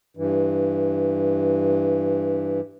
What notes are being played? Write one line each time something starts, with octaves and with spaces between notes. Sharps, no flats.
G2 E3